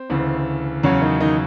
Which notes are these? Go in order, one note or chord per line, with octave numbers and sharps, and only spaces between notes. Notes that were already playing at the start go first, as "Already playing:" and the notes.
Already playing: C4
D2 C#3 E3
E2 C#3 F#3 C#4
D#3 D#4
D#3 D#4